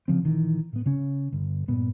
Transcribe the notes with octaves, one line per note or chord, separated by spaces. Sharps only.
C#3 F3 C4
A#1 D#3 E3
A2 B3
C#3 C#4
G1
G2 A#2 B3